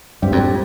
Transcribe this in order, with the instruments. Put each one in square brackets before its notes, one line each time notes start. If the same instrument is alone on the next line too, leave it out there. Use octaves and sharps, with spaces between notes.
[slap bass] G2 [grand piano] G3 C4 G4
[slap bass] F2